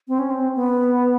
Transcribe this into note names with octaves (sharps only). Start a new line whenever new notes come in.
C4
C#4
C4
B3